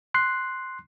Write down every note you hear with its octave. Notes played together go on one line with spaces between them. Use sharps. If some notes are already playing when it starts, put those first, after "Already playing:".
C6 F#6 C7